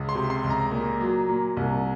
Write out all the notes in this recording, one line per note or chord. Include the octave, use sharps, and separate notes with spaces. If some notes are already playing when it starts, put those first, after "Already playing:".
Already playing: C#2
C6
C3
C6
C#2
A#5
A#2
F#3
A#2
C2